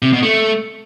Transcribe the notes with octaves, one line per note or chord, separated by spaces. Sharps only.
C3
B2
A3